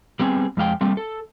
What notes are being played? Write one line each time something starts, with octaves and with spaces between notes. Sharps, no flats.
G3 B3 C4 G#4
F2 G#3 F5 G5
G3 A3 A#3 C4
A4